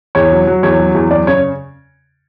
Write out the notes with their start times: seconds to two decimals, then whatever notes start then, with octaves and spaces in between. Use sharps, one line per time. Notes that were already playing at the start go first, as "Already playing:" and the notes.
0.15 E2 C#5
0.32 F#3
0.47 F#3
0.63 E2 C#5
0.80 F#3
0.95 E2
1.11 F#2 D5
1.27 C#3 C#5